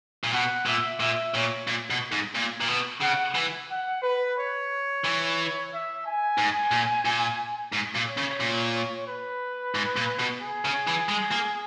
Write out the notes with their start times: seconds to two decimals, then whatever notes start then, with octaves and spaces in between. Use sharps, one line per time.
0.24 A#2
0.33 B2 F#5
0.66 A#2 E5
1.00 A#2 E5
1.33 A#2 C#5
1.67 A#2
1.90 B2
2.12 G#2
2.35 A#2
2.61 A#2
2.68 B2
3.01 C#3 F#5
3.35 E3
3.69 F#5
4.03 B4
4.36 C#5
5.04 E3
5.71 E5
6.04 G#5
6.38 G#2
6.71 A#2
7.05 A#2
7.73 G#2
7.95 A#2
8.06 C#5
8.17 C#3
8.40 A#2
9.07 B4
9.75 G#2
9.96 A#2
10.19 B2
10.42 G#4
10.65 C#3
10.87 E3
11.09 G#3
11.32 A#3